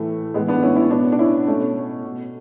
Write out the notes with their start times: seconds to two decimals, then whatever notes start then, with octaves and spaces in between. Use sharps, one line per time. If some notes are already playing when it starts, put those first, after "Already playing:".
Already playing: A2 E3 A3
0.34 A2 G#3 B3
0.38 E3
0.48 B3 D4
0.63 C#4 E4
0.76 C#4 E4
0.91 B2 B3 D4
1.12 D4
1.19 C#4 E4
1.47 B2 A3 C#4
2.03 B2